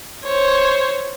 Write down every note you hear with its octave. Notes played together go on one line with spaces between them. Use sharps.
C5 C#5